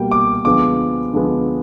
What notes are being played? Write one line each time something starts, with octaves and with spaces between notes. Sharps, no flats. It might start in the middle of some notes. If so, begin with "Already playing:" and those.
Already playing: B2 G3 A#3 G5
D6
D3 F3 G#3 B3 D6
D3 F3 G#3 B3